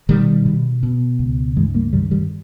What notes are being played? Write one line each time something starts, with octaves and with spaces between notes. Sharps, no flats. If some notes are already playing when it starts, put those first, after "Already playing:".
B2 D#3 G3
B2
B2
C#2
G2 E3 G#3
G3 A#3
G2 D#3 G3
D#3 G3